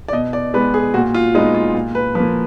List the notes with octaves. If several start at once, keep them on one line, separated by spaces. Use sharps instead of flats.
D5
B2 D#5
D5
G#3 B3 B4
G#4
A#2 F#4
F4
G#3 B3 D#4
F4
A#2
B4
F3 A#3 B4